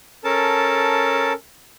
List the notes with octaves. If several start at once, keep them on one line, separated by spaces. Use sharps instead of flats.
C#4 A4 A#4 A5